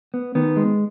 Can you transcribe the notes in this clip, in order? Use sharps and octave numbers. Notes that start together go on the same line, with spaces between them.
B3
D#3 B3
G#3